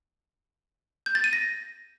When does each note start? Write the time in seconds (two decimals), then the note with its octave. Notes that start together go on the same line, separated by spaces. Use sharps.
1.06 G6
1.15 A6
1.24 D#7
1.33 A#6